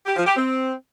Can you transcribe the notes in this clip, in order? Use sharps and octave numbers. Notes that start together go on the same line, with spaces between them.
G4
F3
G4
C4